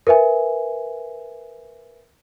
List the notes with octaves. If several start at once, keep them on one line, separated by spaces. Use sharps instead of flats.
A#4 B4 E5 G#5